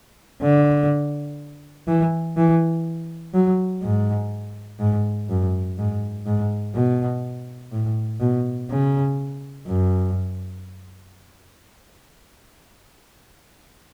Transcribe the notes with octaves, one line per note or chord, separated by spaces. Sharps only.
D3
E3
E3
F#3
G#2
G#2
F#2
G#2
G#2
B2
A2
B2
C#3
F#2